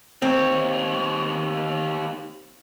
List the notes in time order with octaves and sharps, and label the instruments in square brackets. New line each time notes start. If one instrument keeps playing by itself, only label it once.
[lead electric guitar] D#2 C#5 [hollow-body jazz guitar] C4